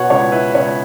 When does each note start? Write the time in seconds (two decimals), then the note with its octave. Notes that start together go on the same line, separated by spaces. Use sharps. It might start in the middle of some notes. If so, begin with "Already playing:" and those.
Already playing: B2 B3 C#5 F#5
0.10 C#2 C#5
0.32 E4 B4
0.55 C#2 C#5